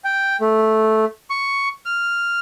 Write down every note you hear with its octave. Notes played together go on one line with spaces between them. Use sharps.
G5
A3
C#6
F6